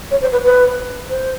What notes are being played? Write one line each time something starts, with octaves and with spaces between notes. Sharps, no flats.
C#5
C5
B4
B4
C5